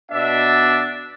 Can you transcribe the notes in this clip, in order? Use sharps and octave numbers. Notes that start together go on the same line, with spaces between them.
B2 D4 D5 E5